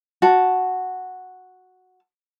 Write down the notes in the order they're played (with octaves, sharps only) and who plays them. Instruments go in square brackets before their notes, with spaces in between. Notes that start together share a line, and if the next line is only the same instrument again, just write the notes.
[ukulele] F#4 A5